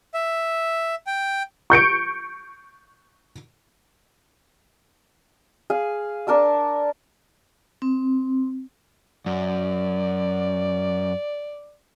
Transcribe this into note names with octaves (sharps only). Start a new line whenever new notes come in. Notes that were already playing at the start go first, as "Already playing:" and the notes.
E5
G5
C#6 G6 C#7 D7
G#4 F5
D4 A#4 A5 E6
C4
F#2 D5